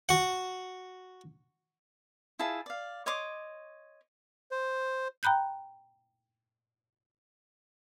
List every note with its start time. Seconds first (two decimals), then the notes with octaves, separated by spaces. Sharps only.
0.09 F#4 F#5
2.39 E4 F4 G#4 A5
2.66 D5 F5
3.06 C#5 D#5 C6 D6
4.51 C5
5.23 G5 A#5 B5 F#6 G6